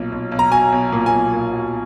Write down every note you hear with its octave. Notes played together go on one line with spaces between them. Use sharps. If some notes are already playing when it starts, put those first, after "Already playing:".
Already playing: B1 A#2
B1
B1
A#5
F#3 G#5
B1
A#2
G#5
B1
A#2
F#3